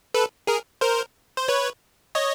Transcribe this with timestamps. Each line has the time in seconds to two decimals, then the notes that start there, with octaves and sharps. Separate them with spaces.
0.14 A4 B4
0.47 G#4 A#4
0.81 A#4 C5
1.37 C5
1.48 B4 C#5
2.15 C#5 D#5